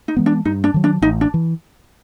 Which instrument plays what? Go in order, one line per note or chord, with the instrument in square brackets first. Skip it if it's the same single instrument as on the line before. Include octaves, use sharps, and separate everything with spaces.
[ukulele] D#4
[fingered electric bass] E3 G#3 B3
[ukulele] D4
[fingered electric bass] G2 [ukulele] D#4
[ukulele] D4
[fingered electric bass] D#3 F#3
[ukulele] D4
[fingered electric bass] A1 [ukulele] D#4
[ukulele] D4
[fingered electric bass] E3